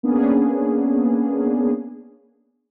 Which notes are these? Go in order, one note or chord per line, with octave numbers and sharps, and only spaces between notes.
A#3 B3 C#4 D4 G#4